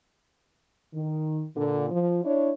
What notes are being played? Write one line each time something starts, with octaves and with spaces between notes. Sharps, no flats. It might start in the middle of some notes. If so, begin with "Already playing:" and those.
D#3
A#2 D3
F3
D4 E4 C#5